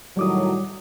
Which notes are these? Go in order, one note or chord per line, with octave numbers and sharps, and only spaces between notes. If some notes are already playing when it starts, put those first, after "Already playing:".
A2 D#3 F#3 G3 D6 D#6